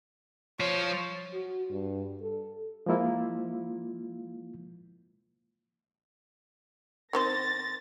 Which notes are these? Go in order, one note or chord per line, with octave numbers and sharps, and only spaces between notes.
F3 C5 C#5
F#4
G2
A4
F3 G#3 A#3 E4 F4
D#3 C4 C5 A6 A#6